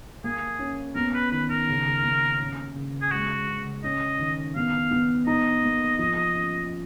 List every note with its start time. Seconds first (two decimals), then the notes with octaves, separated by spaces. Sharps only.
0.24 A#3 G#4
0.59 C#4
0.95 B3 A#4
1.14 B4
1.31 D#3 B4
1.50 A#4
1.68 C#3
2.03 A#3
2.39 C#4
2.76 C#3
3.02 G#4
3.11 G#3 F#4
3.48 C#3
3.84 C#4 D#5
4.20 D#3
4.56 B3 F5
4.91 B3
5.27 D#4 D#5
5.64 A#3
5.99 F3
6.35 C#4